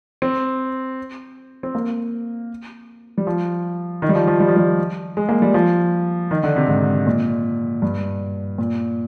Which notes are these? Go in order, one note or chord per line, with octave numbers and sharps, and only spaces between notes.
C4
C4
A#3
G3
F3
D#3
G3
F3
F3
G3
F3
G3
G#3
A#3
G3
F3
D#3
D3
C3
G#2
A#2
G2
A#2